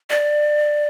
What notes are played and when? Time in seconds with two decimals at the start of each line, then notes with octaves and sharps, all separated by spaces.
0.10 D5